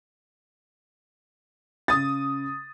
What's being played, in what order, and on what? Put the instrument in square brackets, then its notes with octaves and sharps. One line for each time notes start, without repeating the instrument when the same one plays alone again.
[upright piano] C#3 D#6 A6